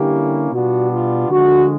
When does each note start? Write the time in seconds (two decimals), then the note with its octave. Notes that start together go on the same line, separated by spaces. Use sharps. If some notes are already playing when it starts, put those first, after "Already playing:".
Already playing: D3 G3 A#3 C#4 E4 G4
0.52 B2 G3 B3 D4 F4 F#4
0.91 F4
1.30 D3 F3 G#3 F#4